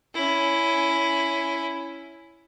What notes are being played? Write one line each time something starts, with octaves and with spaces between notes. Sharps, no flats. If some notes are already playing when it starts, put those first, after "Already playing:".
C#4 E4